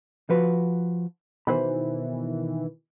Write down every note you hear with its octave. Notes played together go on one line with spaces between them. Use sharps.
F3 F#4 B4
B2 D#3 E3 C5 B5